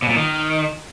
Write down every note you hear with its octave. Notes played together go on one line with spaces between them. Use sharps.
B2
A#2
D#3